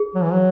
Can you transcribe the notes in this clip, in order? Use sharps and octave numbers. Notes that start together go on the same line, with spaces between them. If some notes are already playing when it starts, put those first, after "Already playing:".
Already playing: G#4
F#3
E3
F#3